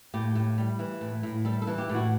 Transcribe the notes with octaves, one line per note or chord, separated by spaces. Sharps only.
A2 G4
A2
G3
E3
A2
A2
G3 A4
A4
E3
G4
A2
F#4